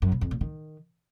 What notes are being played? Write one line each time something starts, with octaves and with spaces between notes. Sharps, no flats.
F#2
B2
F2
A#2
D#3